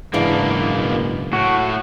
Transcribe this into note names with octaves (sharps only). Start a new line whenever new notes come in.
F#1 G#2 B2 E3 A#3 D4
A2 F#4